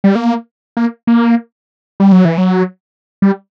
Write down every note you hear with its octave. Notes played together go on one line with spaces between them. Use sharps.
G3
A#3
A#3
A#3
G3
F#3
E3
F#3
G3